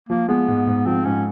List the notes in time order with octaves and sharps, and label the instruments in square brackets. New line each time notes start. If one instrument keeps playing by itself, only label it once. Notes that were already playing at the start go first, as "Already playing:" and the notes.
[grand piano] F3 [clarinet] A#3
[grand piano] G#3 [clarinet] B3
[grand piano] G#2
G#2
[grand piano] F3 [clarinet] C4
[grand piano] G#2 [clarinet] C#4